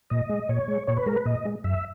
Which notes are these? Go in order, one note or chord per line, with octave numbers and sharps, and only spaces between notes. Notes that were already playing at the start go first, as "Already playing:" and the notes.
A#2 D#5
G#3
A#2 C#5
G#3
A#2 C#5
B4
G#3 A#4
B4
A#2 D#5
G#3
F#2 E5